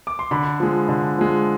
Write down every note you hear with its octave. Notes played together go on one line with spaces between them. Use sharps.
D6
C6
D3 B5
F3 G#3
D3
F3 G#3